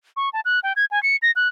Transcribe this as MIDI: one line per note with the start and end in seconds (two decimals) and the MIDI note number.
0.17 0.29 85
0.33 0.41 81
0.45 0.60 90
0.63 0.73 79
0.76 0.85 92
0.91 1.02 80
1.03 1.17 97
1.22 1.31 94
1.36 1.48 90